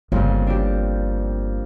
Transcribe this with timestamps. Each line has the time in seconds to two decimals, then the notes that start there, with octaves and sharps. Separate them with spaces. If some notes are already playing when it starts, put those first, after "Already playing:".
0.12 G1 F2 A#2 C#3
0.47 D4 G4